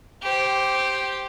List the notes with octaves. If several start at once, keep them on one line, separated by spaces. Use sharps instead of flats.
G4 C5